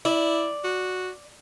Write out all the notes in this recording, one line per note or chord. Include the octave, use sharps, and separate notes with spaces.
E4 D5
F#4